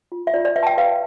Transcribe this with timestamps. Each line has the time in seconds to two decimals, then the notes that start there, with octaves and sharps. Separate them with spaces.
0.12 F4
0.27 E5
0.34 F4 D5
0.45 D5
0.56 B4 E5
0.63 A5
0.67 G5
0.77 B4 F5